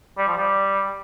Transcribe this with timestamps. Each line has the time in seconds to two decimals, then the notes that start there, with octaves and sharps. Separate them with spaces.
0.18 G3
0.28 F3
0.38 G3